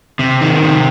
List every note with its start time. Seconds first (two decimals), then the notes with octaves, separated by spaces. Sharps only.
0.19 C3
0.41 D#3
0.62 C3